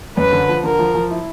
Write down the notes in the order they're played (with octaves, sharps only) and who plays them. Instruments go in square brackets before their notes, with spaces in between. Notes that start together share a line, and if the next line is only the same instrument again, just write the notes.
[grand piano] F#2 [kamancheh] B4
[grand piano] D3
F3
[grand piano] D3 [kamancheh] A#4
[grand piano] F3
F3
E4